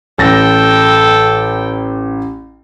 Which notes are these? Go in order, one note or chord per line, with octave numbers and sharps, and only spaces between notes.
A1 A4 G5 A6 A#6